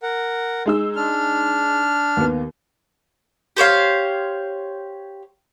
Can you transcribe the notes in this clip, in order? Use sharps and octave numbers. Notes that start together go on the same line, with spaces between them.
A#4 F#5
G#3 D#4 E6
D4 F6
D#2 B3
G4 C5 C#5 F5